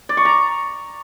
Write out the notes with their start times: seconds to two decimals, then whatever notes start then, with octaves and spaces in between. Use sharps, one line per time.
0.09 D5
0.17 C#6
0.25 A#5